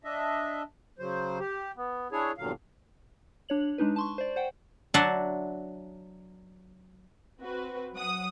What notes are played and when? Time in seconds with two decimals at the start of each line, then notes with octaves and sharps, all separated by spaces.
0.04 D4 D#5 E5
0.99 C#3 F#3 C5
1.39 G4
1.76 B3
2.12 D4 E4 G#4 C#5
2.38 E2 G2 A#2 D3 F#3 F5
3.49 D4 C#5 F#7
3.78 G#3 D4 D#4 B4
3.96 A5 C6 C#6
4.18 C5 D5
4.36 C5 F#5 G5
4.94 F#3 D4 E5 F#5 A5 C6
7.41 C4 F#4 B4
7.94 F#3 F#5 D#6